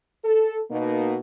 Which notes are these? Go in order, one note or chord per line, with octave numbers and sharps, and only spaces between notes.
A4
B2 A#3 D#4